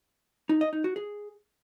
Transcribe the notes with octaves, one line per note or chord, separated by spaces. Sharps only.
D#4
D#5
D#4
F#4
G#4